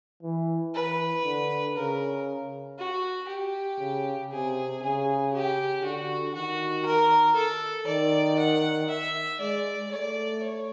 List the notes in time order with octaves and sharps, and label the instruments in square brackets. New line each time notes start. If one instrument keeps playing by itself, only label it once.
[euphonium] E3
[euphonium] E3 [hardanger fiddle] B4
[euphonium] D3
[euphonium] C#3 [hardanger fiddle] A#4
[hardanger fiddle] F#4
G4
[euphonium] C#3
[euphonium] C3 [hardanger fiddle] G#4
[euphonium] C#3 [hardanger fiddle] G#4
[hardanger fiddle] G4
[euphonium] D3 [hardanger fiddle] F#4
[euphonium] D#3 [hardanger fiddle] F#4
[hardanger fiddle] A#4
A4
[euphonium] D#3 [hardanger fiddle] D5
[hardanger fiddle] F#5
E5
[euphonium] G#3 [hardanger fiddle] D5
[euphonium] A3 [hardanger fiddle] D5
[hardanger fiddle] C#5